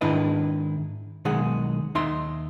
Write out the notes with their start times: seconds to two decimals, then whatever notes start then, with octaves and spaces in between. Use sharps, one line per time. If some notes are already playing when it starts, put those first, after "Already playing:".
0.01 G#2 D#3 D4 E4 B4 D#5
1.25 B1 D#3 G#3 G#4 F#5
1.95 D#2 D#4 E5 C6